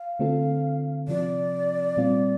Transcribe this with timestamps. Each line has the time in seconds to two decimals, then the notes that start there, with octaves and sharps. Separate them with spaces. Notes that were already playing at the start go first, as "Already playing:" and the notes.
Already playing: F5
0.19 D3 A3 C4 F4 A4
1.08 C3 F3 C4 F4 D5
1.97 A#2 G3 C4 F4